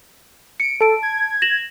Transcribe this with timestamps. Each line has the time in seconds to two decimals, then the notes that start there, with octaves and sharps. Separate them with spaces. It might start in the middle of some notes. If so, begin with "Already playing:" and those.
0.60 C#7 D7
0.81 A4 A5 D7
1.03 G#6
1.42 A#6 E7 F#7